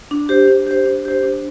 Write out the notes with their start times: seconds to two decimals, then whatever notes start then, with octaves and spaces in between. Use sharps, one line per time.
0.11 D4
0.29 G4 C5
0.48 D4
0.67 G4 C5
0.86 D4
1.05 G4 C5
1.23 D4